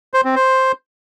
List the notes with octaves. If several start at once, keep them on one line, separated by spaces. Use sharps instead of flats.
C5
C4
C5